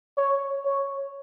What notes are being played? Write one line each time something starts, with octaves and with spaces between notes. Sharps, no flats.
C#5
C#5